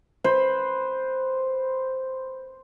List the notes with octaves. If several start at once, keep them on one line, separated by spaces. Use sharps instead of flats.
B4 C5 B5